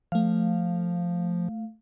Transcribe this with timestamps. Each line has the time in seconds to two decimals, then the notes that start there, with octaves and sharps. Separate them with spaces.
0.12 F3 A3 F5